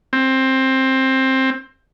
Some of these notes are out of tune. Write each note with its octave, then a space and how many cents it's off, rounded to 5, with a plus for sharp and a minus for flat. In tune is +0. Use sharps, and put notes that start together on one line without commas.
C4 +15